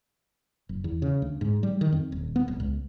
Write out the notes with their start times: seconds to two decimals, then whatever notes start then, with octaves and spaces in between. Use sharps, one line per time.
0.69 F#1
0.84 E2
1.02 C#3
1.22 D2
1.41 G#2
1.63 G3
1.81 D#3
1.92 F2
2.12 D#1
2.36 B3
2.48 D1
2.60 C#2